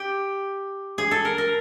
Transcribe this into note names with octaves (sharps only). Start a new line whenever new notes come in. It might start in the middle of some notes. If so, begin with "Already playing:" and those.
Already playing: G4
G#4
A4
A#4
A#4